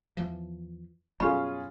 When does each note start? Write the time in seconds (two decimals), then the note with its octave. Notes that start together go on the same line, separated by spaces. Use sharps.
0.17 E2 E3 F3
1.20 F#2 B2 G3 C#4 F4 G4 G#4 B5